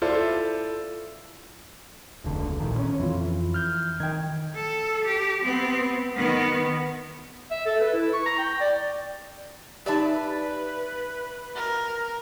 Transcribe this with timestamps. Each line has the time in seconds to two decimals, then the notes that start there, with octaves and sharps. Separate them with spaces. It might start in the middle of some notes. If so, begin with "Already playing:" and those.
0.02 E4 F4 A4 C5 D5
2.24 E1 C#2 D3
2.60 A#1 A#2 D#3
2.78 C#4
2.99 F2 E3 F4
3.54 F6 G6
4.00 D#3 G5 G#6
4.55 A4
5.04 G4
5.44 B3 C4
6.16 D#3 B3
7.51 E5
7.66 A4
7.80 B4
7.93 E4
8.13 C#6
8.26 A#5
8.38 G5
8.60 D5
9.86 D#4 G4 B4 D5 E5 A5
11.55 A#4